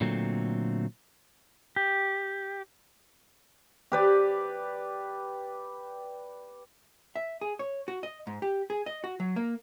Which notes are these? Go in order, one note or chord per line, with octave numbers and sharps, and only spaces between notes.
A#2 D3 F#3 A3 C4
G4
G4 B4 D5
E5
G#4
C#5
F#4
D#5
G#2
G4
G#4
D#5
F#4
F#3
A#3